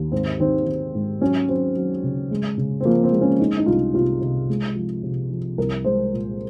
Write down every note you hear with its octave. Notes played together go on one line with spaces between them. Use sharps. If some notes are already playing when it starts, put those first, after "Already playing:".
Already playing: D#2
G#2 C4
D#3 C4
D#3
G#2
F#3 C#4
F#3 C4
F#3
C#3
G#3
C#3
C4
F3 A#3
C4
G#3
C#4
G#3 D#4
D#4
C2 F4
C3 F4
C3
G#3
F3
C3
F3
C2 A#4
G#3 C5
A#2